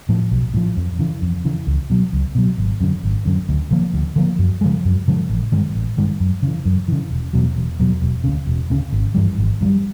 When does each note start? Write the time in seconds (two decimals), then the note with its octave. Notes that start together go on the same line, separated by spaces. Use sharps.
0.09 A2 F3
0.31 B1
0.54 A2 F3
0.77 F2
0.99 C#3 E3
1.22 F2
1.44 C#3 E3
1.67 C#2
1.90 B2 F#3
2.13 C#2
2.35 B2 F#3
2.58 G#1
2.81 F#2 D3
3.04 G#1
3.25 F#2 D3
3.49 D2
3.71 D3 F3 A#3
3.94 D2
4.16 D3 F3 A#3
4.39 F#2
4.61 C#3 F3 G#3
4.85 F#2
5.08 C#3 F3 G#3
5.29 A1
5.52 G2 D#3 G#3
5.75 A1
5.97 G2 D#3 G#3
6.20 F#2
6.42 C#3 E3
6.65 F#2
6.88 C#3 E3
7.10 E1
7.33 E2 B2 F#3
7.56 E1
7.79 E2 B2 F#3
8.02 E1
8.24 D2 C#3
8.47 E1
8.70 D2 C#3
8.92 G#1
9.15 G2 E3 G3
9.38 G#1
9.61 G2 E3
9.65 G3